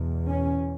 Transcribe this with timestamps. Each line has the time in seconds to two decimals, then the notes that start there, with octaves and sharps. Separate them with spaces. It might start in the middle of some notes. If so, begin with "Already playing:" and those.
Already playing: E2 B2
0.27 C#4